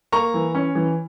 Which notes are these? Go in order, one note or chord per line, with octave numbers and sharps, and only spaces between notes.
A#3 A#5 C#6
E3
C#4
E3